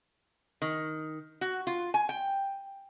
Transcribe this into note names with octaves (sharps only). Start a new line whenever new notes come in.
D#3
F#4
F4
G#5
G5